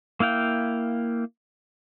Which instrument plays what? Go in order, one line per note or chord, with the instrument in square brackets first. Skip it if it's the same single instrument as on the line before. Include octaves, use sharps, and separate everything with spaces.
[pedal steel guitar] A#3 E4 F5 G5